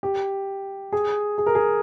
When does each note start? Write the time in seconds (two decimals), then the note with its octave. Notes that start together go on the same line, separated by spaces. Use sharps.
0.03 G4
0.92 G#4
1.38 G#4
1.46 A#4
1.55 G#4